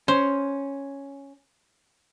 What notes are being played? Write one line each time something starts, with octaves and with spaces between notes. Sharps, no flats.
C#4 C5